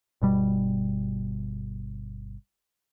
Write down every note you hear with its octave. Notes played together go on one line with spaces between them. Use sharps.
G1 B2 G3